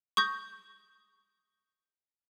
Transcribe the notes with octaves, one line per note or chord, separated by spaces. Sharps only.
C#6 D#6 G6 A#6